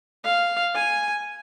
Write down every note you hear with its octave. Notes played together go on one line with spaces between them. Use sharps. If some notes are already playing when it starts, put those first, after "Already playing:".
F5
G#5